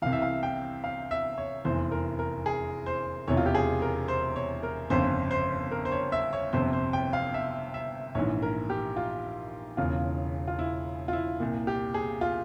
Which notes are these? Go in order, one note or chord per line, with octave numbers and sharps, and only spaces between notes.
C2 C3 E3 F5
E5
F5
G5
F5
E5
C#5
F1 E2 E3 C5
A#4
A#4
G#4
C5
E1 E2 C3 E3 C#5
F4
G4
G#4
A#4
C5
C#5
A#4
G1 F2 C#3 C5
C5
A#4
C5
C#5
E5
C#5
G1 F2 C3 C5
C5
G5
F5
E5
E5
A#1 G#2 E3 C#5
A#4
G4
F4
E1 E2 C#3 F4
F4
E4
F4
E4
C2 A#2
G4
G#4
F4